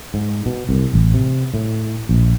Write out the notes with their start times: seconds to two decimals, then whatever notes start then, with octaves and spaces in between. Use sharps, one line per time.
0.14 G#2
0.46 B2
0.69 C2
0.94 A1
1.14 C3
1.54 A2
2.09 A#1